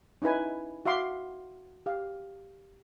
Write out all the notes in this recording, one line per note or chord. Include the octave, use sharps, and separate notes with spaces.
C#4 D#4 E4 B4 G#5
F#4 E5 F5 C6 D6
G4 F5